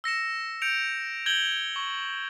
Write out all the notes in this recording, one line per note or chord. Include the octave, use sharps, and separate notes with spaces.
E6 A#6 C#7 E7
G6 C#7 D7 F7
G6 G#6 F#7 G7
C#6